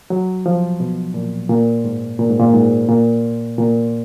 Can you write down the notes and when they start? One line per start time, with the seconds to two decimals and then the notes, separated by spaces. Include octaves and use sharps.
0.10 F#3
0.46 F3
0.80 B2
1.14 A#2
1.49 A#2
1.84 G#2
2.19 A#2
2.29 G#2
2.40 A#2
2.54 G#2
2.88 A#2
3.58 A#2